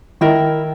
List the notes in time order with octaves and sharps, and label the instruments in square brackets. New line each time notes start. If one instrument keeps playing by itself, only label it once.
[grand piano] D#3 [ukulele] E4 A#4